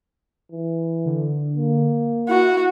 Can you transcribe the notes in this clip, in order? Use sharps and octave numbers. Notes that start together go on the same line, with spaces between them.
E3
D3
A#3
E4 F#4